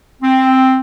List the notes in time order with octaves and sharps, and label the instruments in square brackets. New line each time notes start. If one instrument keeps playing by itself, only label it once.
[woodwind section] C4